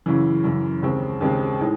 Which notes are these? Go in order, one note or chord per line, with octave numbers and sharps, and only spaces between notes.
F#2 C#3 E3
F#2 C#3 E3
D#2 C#3 G#3 C4
D#2 C#3 G#3 C4
A2 G#3 D#4